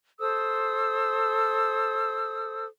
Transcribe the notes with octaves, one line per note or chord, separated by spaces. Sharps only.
A4 C5 D#6 E6